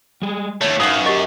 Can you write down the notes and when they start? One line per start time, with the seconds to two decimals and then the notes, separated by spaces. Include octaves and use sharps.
0.22 G3 G#3
0.61 D#2 A3 C#5
0.80 F#2 D#4 B4 F5 D#6 C7 F#7
1.06 G4 A#4 D#5 C#6 A6